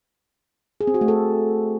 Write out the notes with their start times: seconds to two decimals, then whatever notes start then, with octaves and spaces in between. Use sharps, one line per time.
0.81 G#4
0.87 C4
0.94 F#4
1.01 A3
1.08 A4